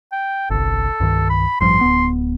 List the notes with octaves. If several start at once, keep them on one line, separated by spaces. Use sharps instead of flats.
G5
G1 C2 A4
C2 G2 D#3
B5
A1 G2 F3 C6
D1 B3